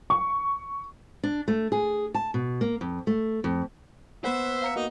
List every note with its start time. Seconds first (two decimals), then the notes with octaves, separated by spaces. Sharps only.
0.10 C#6
1.23 D4
1.48 A3
1.72 G#4
2.14 A5
2.34 B2
2.61 A#3
2.81 F2
3.07 A3
3.44 F2
4.24 B3 B4 C5 E5 F#5
4.62 F5 A#5 C#7
4.76 A#3 D#4 F#4